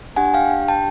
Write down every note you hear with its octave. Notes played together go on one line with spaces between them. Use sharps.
D4 G4 F#5 G#5
F5 G5
G5 A5